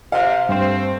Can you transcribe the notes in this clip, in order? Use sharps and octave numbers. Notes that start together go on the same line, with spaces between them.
C3 F5
G2 A3 C4 C5